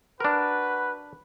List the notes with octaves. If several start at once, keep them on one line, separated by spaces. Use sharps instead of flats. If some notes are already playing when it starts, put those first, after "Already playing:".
D4 F#4 A#4 B4